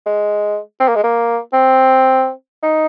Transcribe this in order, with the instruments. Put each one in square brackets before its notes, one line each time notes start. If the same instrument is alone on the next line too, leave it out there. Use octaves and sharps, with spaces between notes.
[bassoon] G#3
C4
A#3
G#3
A#3
C4
D#4